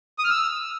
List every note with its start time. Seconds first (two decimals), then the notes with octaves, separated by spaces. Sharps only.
0.19 D#6
0.24 F6
0.30 E6